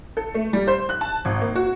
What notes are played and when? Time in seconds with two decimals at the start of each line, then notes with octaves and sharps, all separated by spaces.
0.17 A4
0.35 A3
0.53 G3
0.67 C5
0.89 F#6
1.01 A5
1.25 G#1
1.41 A#3
1.55 F#4